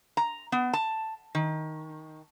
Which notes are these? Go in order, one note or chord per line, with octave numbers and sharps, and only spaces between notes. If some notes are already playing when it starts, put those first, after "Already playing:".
A#5
B3
A5
D#3